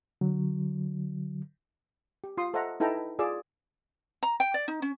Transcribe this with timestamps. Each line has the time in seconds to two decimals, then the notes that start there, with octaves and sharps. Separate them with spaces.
0.21 D3 F#3
2.24 G4
2.37 F4 C6 D#6
2.54 A4 C5 D#5 E5 F#5 A#5
2.80 D#4 E4 A4 B4 G5 A#5
3.19 F4 G#4 D5 E6
4.23 A#5
4.40 G5
4.54 D5
4.68 D#4
4.82 C#4